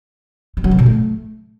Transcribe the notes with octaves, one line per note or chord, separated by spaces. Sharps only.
G3
F#3
C#3
A#2
A3